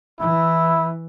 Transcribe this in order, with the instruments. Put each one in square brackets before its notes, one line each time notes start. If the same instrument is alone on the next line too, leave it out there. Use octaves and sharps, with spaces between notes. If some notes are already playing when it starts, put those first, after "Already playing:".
[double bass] E3 [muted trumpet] E4